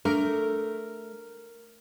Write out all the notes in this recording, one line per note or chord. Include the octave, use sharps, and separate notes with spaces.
A3 D4 A#4